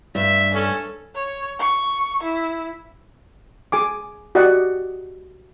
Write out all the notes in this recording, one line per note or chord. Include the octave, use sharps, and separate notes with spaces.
G2 E5
C#4 A4
C#5
C#6
E4
G#4 G#5 D6
F#4 G4 D5 D#5 F#5